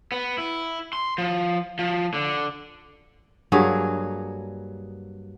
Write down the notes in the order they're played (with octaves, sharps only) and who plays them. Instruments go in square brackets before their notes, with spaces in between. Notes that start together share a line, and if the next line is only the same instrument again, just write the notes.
[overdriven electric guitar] B3
E4
C6
F3
F3
D3
[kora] G2 F#3 A#3 G#4